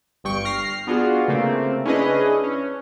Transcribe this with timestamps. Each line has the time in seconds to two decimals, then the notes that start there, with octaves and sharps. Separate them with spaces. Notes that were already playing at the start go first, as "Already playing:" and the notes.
0.24 G1 G2 G5 C#6
0.45 F6 A#6 C7
0.87 B3 D4 F4 F#4 G#4
1.28 C#3 A3 A#3 C4
1.86 C#4 D4 E4 G#4 B4 D#5
2.44 C#4